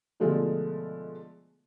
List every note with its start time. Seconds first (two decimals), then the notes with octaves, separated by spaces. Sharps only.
0.20 B2 D3 F3 G#3 A3